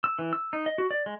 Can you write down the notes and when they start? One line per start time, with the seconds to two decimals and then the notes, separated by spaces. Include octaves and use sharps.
0.04 E6
0.19 E3
0.33 E6
0.53 D#4
0.66 D#5
0.78 F#4
0.91 D5
1.06 G#3